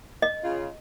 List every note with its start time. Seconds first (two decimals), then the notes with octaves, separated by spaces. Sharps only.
0.22 D#5
0.44 C#3 F4